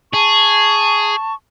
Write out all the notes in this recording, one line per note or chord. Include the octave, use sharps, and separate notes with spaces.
G#4 A5 C#6